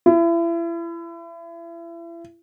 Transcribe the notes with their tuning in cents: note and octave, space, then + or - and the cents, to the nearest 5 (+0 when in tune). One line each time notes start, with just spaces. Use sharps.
E4 +35